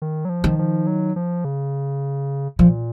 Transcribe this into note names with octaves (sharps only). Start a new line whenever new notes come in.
D#3
F#3
F3
D#3
F3
F#3
F3
C#3
A#2 F3